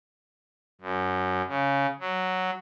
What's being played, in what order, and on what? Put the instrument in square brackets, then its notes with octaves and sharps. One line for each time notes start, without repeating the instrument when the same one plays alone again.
[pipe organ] F#2
C#3
F#3